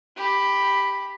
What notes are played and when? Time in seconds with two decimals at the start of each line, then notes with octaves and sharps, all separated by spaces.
0.17 G4 B5